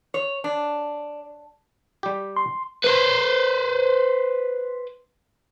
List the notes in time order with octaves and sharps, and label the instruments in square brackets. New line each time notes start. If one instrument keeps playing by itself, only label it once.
[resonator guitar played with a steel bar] C#5
D4
[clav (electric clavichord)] G3 G4
[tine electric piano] C6
[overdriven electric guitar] B4 C5